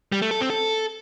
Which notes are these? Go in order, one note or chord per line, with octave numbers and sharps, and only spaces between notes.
G3
A3
A4
C4
A4